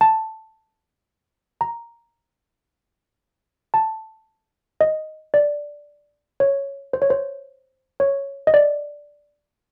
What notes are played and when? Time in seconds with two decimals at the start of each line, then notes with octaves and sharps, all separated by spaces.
0.01 A5
1.61 A#5
3.74 A5
4.81 D#5
5.34 D5
6.40 C#5
6.93 C5
7.02 C#5
7.10 C5
8.00 C#5
8.47 D#5
8.54 D5